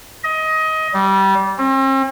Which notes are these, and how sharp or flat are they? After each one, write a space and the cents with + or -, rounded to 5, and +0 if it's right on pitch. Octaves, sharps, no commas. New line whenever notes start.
D#5 +20
G3 -20
C4 +45